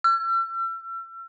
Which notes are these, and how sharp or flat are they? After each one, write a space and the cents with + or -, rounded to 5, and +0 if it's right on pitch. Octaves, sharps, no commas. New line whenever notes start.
E6 +40